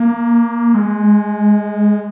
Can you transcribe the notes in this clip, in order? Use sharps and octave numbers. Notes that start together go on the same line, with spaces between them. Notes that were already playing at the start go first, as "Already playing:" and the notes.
Already playing: A#3
G#3